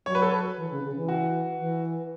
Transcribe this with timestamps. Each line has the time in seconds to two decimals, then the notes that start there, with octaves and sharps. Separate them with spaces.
0.06 F#3 C#5
0.15 B4
0.22 A4
0.31 B4
0.57 E3
0.71 C#3
0.83 C#3
0.96 E3
1.08 F#4
1.59 E3